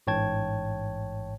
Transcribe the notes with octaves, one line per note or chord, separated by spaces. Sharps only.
A1 G#2 C#5 G5 A5 G#6